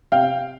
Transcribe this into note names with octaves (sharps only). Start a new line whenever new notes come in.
C3 F5 G5